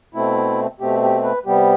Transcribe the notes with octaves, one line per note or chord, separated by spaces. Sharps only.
B2 A3 C4 E4
B2 A3 C4 G4
G4
B4
C3 G3 B3 G4